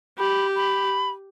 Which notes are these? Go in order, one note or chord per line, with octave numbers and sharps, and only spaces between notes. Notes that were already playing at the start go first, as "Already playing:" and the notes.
G4 B5
B5